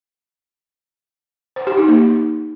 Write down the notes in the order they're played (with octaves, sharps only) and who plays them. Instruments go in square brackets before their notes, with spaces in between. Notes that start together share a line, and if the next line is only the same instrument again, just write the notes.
[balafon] C5
G4
D#4
A#3